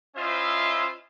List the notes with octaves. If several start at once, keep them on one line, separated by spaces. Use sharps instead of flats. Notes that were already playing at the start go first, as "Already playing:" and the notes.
C#4 E4 F4 C5 D#5 E5